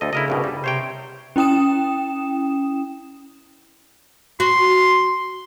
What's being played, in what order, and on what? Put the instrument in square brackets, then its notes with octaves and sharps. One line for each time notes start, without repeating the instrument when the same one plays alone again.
[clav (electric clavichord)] D2 D#5 [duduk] A4
[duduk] C#3 [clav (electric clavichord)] E4 A#4 D#5
[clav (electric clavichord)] C2 G2 B2
G3
[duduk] C3 [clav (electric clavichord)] C5 C#5 G5
[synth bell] C#4 E4 G5 D#6 E7
[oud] F#4 [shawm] C6